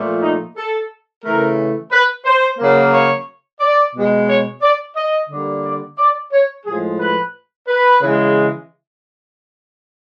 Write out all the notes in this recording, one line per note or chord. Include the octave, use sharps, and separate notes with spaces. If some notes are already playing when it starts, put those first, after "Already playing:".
Already playing: A#2 F3 A3
D#4
A4
C#3 E3 A3 A#4
B4
C5
C#3 F#3 A#3
C#5
D5
B2 G#3
C#5
D5
D#5
D3 G3 A#3
D5
D5
C#5
A2 F3 G#3 G#4
B4
B4
C#3 E3 G#3